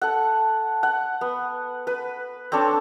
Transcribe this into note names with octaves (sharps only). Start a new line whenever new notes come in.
A4 F#5
F#5
B3
B4
C4 D4 A4 C#5